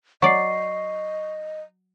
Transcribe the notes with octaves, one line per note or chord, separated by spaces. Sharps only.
F#3 D5 D#5 C#6 C7